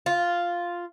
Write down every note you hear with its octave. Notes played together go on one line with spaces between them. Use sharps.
F4